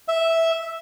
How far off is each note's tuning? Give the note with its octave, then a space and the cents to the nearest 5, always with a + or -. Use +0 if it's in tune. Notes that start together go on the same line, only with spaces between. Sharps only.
E5 -5